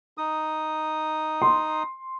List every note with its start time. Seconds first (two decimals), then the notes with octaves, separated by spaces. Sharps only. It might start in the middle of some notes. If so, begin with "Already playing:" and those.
0.18 D#4 D#6
1.42 C6